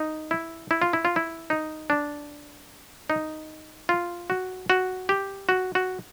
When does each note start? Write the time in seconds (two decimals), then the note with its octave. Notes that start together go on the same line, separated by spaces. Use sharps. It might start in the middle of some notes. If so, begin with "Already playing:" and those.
Already playing: D#4
0.31 E4
0.71 E4
0.82 F4
0.93 E4
1.05 F4
1.16 E4
1.50 D#4
1.90 D4
3.10 D#4
3.89 F4
4.30 F#4
4.70 F#4
5.09 G4
5.49 F#4
5.75 F#4